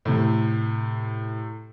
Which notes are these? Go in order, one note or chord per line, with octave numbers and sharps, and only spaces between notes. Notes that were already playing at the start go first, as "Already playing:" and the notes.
A2 C3